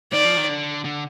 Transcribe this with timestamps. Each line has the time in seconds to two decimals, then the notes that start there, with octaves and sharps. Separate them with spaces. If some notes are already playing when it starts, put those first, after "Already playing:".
0.12 D#3 D5
0.25 F3
0.37 D#3
0.49 D3
0.85 D3